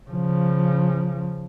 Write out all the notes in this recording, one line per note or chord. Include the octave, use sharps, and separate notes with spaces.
C#3 F3